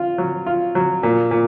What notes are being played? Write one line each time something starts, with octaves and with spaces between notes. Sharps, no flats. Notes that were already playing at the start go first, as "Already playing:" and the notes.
Already playing: F4
F#3
F4
F#3
A#2
A#2